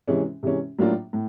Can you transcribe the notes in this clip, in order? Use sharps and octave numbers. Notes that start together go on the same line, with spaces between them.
C3 E3 G#3 C#4
C3 E3 G#3 C#4
A2 F#3 A#3 D4 F4
A2